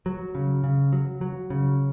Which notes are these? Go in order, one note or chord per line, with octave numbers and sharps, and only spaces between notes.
F#3
C#3
C#3
F#3
F#3
C#3